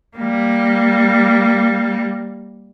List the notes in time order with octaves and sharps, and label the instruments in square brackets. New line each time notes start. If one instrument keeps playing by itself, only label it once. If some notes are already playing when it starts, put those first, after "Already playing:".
[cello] G3 A#3